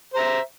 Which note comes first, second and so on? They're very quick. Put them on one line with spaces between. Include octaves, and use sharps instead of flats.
C5 A#5 E5